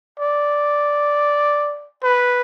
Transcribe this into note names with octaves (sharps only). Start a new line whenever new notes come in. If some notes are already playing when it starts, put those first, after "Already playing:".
D5
B4